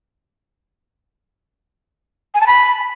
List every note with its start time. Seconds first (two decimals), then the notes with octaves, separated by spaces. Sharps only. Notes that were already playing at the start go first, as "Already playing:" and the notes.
2.34 G#5
2.41 A5
2.47 B5